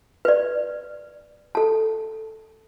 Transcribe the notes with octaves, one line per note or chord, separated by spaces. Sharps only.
B4 D5
A4 A5